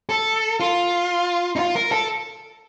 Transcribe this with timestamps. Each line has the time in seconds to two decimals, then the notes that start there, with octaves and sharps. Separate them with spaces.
0.09 A4
0.60 F4
1.56 D#4
1.59 F4
1.76 A#4
1.92 A4